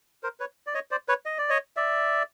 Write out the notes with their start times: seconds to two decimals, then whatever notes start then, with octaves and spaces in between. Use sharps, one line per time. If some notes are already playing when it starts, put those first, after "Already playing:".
0.23 A#4 C5
0.40 B4 C#5
0.67 D5
0.74 C#5 D#5
0.91 C5 D5
1.08 B4 C#5
1.26 D#5
1.38 D5
1.50 C#5 D#5
1.77 D5 E5